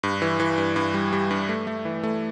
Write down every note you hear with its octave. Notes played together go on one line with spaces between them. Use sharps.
G2
E3
E3
G2
G2
G3
G3
G2
A3
A3
E3
A3